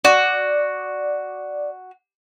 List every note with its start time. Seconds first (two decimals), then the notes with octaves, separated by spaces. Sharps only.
0.05 F#4 D5